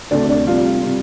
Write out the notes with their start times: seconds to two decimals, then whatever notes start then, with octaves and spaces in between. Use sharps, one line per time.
0.11 D2 C3 A3 D4 D5
0.29 D4 D5
0.47 F2 C3 G3 F4 F5
0.83 C3 G3